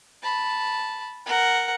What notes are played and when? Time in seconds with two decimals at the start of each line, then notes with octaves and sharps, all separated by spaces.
0.23 A5 B5
1.26 A#4 F#5